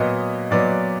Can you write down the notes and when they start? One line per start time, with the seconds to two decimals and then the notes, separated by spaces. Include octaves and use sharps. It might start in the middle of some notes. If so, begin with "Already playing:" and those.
Already playing: A#2 F#3 B3 D#5
0.51 A#2 F#3 B3 D5